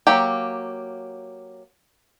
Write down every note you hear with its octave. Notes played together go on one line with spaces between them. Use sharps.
F#3 A#3 G4